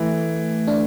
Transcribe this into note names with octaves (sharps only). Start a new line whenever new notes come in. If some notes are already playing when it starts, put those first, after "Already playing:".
Already playing: E3 A3
D4